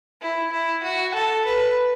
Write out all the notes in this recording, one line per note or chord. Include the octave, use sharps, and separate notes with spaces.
E4
E4
F#4
A4
B4